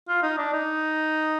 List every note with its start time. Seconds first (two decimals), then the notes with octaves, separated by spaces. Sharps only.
0.08 F4
0.23 D#4
0.38 D4
0.53 D#4